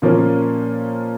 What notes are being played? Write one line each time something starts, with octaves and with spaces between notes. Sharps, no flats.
A#2 F3 A#3 C#4